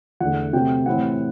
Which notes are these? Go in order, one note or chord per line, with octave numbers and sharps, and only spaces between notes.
E2 D3 A3 F#5
C3 F#3 A3 G5
A2 E3 G3 C4 F#5